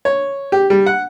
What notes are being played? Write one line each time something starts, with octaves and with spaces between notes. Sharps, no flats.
C#5
G4
G3
F#5